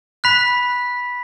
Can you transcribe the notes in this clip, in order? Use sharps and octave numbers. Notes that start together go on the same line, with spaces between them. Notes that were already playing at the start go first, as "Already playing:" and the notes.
B5 F#6 B6